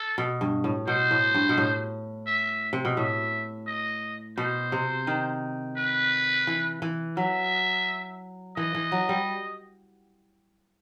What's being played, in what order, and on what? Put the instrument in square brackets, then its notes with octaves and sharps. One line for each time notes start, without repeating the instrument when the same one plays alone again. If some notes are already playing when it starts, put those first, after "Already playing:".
Already playing: [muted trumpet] A4
[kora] B2
G2
A2
[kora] B2 [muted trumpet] C5
[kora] A2
G2
B2
A2
[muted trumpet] E5
[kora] C3
B2
[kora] A2 [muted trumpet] E5
[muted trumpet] D#5
[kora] B2 [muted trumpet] C5
[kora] C3
D#3
[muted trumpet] B4
[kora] E3
E3
[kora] F#3 [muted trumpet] E5
[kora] E3 [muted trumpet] D#5
[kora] E3
F#3
G3